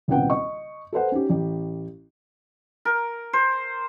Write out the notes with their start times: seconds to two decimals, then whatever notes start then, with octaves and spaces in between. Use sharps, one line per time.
0.08 D#1 C2 C#3 B3 F#5 G5
0.30 D#5 C#6
0.93 A4 B4 C5 F#5
1.12 C#4 D#4 G4
1.30 A1 G4
2.85 A#4
3.33 C5